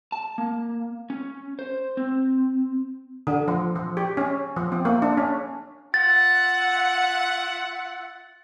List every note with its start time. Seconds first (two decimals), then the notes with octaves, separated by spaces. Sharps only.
0.12 A5
0.38 A#3
1.10 C#4
1.59 C5
1.97 C4
3.27 D3
3.48 F3
3.75 F3
3.97 G4
4.17 C#4
4.56 F3
4.72 C4
4.85 A#3
5.02 D4
5.17 C#4
5.94 F4 E5 F#5 A6